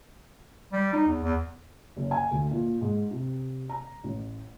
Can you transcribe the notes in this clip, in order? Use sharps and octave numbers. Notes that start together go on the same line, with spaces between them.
G3
D#4
E2
E2
F#1
G#5
D2
A#2
G#2
C3
A#5
A1